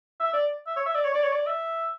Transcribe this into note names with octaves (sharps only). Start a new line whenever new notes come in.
E5
D5
E5
C#5
E5
D5
C#5
D5
C#5
D5
E5